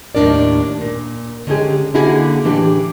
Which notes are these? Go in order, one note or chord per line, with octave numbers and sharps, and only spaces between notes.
D#2 A2 D#3 D4 A#4 D5
A#2
D3 G#3 C#4 G4 G#4
D3 A#3 E4 F#4 G#4
A2 E3 D4 G4